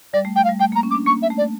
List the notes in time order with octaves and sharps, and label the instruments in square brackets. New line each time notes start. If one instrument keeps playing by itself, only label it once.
[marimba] G3 [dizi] D5
[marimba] A3
[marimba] A3 [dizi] G5
[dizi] F5
[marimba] G3
[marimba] A3 [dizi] G5
[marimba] A#3 [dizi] A#5
[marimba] C#4
[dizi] D6
[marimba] D4
[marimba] A#3 [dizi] C#6
[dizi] E5
[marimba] A3
[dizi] D5